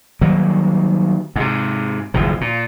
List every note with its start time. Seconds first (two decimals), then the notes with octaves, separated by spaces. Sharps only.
0.21 D#3 F#3 G3 A#3
1.36 G#2 C3
2.14 F#1 D#2 A2 F3
2.41 A#2